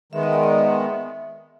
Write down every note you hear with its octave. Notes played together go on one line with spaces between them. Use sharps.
D#3 G#3 B3 E5
D#5
D5
D#5
E5